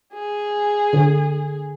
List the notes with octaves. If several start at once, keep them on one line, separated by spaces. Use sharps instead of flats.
G#4
D3